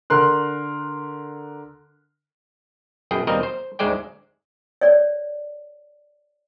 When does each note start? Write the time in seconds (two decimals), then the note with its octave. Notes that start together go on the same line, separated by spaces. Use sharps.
0.10 D3 A#4 C6 F#6
3.11 F#2 B2 G#4 G5
3.27 D#2 B2 G3 C4 A#4 D#5
3.43 C5
3.79 D2 G#2 G#3 C5 D5 G5
4.81 C#5 D5